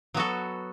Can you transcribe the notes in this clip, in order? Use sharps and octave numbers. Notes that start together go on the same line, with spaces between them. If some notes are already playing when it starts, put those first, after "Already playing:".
F#3 B3 F#4 A4